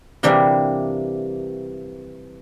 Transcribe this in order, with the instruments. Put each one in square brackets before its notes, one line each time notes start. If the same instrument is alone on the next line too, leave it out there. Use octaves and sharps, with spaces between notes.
[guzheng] C3 E3 G3 A#3 D4